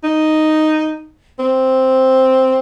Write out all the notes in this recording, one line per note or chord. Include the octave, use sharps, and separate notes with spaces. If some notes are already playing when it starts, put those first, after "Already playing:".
D#4
C4